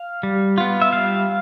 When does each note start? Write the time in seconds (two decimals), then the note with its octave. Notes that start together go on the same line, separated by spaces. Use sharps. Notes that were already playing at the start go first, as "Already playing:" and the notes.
Already playing: F5
0.23 G3
0.58 B3 F4
0.82 E5
0.93 G3 F5